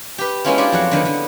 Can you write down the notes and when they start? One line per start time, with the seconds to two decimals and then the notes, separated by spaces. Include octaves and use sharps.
0.18 G4 B4
0.44 G#3 A#3 B3 C#4 E4 F4
0.58 D4 G4 G#4 C5 D5
0.72 F2 F#3 F#5
0.91 D3 D#3 B3 E4
1.05 D3